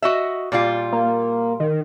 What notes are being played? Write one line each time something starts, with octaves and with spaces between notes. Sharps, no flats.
F#4 D#5 E5
A#2 G3 F4
A#3
D#3